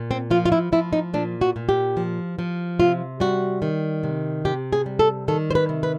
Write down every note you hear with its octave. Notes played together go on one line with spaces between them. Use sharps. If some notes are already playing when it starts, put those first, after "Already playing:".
Already playing: A#2
C4
F3 F4
F4
E4
F3 E4
D#4
A#2 D4
F#4
A#2
G4
F3
F3
C3 F4
G3 F#4
D#3
C3
C3 G4
G#4
G3
A4
D#3 A4
C5
B4
C3
B4